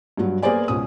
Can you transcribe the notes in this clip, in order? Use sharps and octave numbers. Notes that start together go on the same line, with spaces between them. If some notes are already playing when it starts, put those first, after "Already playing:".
G2 F#3
A#3 B3 G#4 C5 D5 G#5
C#2 B2 C#4 D#6